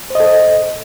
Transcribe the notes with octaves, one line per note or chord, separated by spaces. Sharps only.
A4 C5 D#5